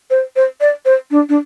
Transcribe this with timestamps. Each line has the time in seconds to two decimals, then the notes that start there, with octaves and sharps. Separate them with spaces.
0.10 C5
0.36 C5
0.61 D5
0.85 C5
1.11 D4
1.29 D4